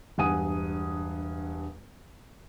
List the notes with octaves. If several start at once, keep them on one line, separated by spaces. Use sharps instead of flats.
E1 G2 F#5 G#5 D#6 D#7